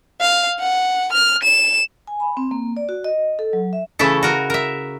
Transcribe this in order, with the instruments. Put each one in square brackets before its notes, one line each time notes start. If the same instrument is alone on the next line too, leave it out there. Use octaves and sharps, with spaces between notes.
[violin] F5
F#5
F6
E7
[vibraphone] G#5
B5
C4
A#3
D5
F#4
D#5
A4
F#3
E5
[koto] C#3 E3 A3 E4 A4
F#4 A#4
A#4 E5